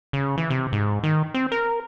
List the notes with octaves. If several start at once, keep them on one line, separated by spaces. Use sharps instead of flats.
C#3
E3
C3
G#2
D#3
C4
A#4